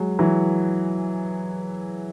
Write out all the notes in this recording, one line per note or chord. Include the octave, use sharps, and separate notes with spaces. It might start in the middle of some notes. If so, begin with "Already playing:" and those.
Already playing: F#3 G#3
E3 F#3